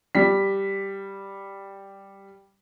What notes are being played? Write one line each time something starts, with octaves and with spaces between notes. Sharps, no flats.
G3 B6